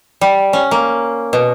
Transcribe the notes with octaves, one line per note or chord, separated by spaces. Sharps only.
G3
C#4
A#3
B2